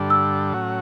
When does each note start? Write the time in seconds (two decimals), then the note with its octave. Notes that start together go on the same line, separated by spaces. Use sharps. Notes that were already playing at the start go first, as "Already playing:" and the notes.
Already playing: G2 D3 G3 D4 A4
0.10 E6
0.53 A2 F#3 C#4 F#4